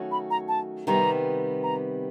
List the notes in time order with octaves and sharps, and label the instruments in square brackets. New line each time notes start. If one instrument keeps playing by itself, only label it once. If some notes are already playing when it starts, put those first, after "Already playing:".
Already playing: [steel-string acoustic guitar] D#3 F#3 A3 C#4 F#4
[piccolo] B5
A#5
A5
[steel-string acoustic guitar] C3 D#3 G3 B3 [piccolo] A#5
[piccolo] A#5